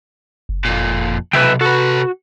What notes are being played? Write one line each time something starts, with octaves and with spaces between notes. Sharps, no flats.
F#1
F2 A#2
B1 C3 B4 E5 G5
F#4 A4 B4